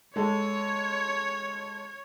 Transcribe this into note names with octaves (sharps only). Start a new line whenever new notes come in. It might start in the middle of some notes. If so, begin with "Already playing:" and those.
G#3 A4 C#5